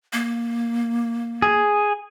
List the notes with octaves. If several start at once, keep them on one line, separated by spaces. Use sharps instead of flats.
A#3
G#4